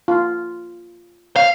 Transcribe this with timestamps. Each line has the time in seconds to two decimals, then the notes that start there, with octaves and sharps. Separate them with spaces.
0.08 F4
1.36 F5